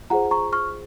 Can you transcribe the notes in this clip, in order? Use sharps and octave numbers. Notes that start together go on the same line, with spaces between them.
F4 G#4 C5 F#5 A#5
A#5 C#6
C#6 F6